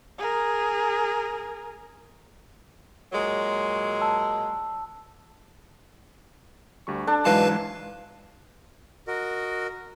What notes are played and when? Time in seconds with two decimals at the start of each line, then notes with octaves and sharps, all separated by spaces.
0.18 G#4 A#4
3.12 A#2 F#3 G#3
4.01 A5 E6
6.87 D2 G3 C#6
7.07 D4 A4
7.25 G#2 E3 F#3 G#3 B4 F5 A5
9.07 F#4 A#4 D#5